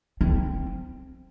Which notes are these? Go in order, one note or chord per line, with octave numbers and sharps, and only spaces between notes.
C4